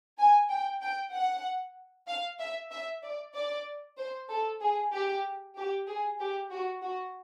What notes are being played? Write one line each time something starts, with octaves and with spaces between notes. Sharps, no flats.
G#5
G5
G5
F#5
F5
E5
E5
D5
D5
C5
A4
G#4
G4
G4
G#4
G4
F#4
F#4